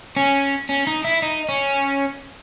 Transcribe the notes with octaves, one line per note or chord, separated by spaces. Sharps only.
C#4
C#4
D#4
E4
D#4
C#4